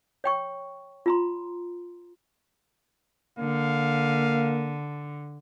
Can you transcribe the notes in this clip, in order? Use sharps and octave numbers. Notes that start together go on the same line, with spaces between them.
C#5 G5 C#6
F4 A#5 C6
D3 A#3 F5